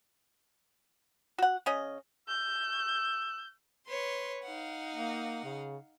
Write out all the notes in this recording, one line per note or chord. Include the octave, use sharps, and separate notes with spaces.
F#4 F#5
C#3 C#4 D#5
C#6 E6 G6
B4 C#5 C6
D#4 F5 F#5
A#3
C#3